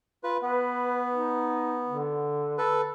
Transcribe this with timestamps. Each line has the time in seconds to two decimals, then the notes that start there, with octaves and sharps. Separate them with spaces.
0.23 F4 B4
0.42 B3 B4
1.13 D#4
1.87 D3
2.58 A4 B4